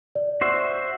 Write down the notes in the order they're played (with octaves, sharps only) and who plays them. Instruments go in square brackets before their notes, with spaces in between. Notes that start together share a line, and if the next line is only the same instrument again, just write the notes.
[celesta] D5
[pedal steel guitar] F#4 C5 E5